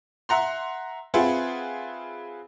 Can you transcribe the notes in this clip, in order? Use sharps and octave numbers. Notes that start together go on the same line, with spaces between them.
E5 F#5 A#5 C6
C4 F4 G#4 B4 E5 F#5